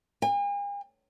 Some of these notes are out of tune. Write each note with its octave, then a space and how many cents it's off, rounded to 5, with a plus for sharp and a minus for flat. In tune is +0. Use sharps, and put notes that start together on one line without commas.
G#5 -45